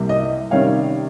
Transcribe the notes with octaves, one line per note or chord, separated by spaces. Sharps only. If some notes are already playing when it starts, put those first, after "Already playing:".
Already playing: C2 C3 G3 A#3
D#5
C3 D#3 G3 C#4 C#5 F5